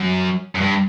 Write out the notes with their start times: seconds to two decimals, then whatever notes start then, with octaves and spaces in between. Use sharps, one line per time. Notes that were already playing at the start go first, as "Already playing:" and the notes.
Already playing: F#2
0.55 F#2
0.61 G2